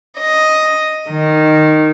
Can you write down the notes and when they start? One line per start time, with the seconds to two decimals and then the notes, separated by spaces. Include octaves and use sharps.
0.19 D#5
1.09 D#3